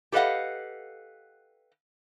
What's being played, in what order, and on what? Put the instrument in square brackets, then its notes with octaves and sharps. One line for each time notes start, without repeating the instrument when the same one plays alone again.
[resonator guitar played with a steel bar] G4 A4 B4 D#5 F5 F#5